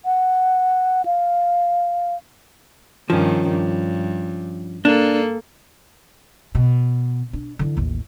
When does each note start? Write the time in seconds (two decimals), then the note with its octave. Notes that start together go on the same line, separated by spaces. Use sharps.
0.05 F#5
1.06 F5
3.10 G2 D#3 F3 C#4
3.49 G2
4.85 A#3 D4 A4
6.55 B2
7.33 D4
7.59 D3 E3
7.77 A1 D#2